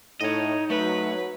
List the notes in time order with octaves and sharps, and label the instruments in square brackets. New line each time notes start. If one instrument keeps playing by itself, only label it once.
[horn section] A2 [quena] D#4 [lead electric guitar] C#5 D#5
[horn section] F#3 [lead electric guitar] A3 [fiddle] B4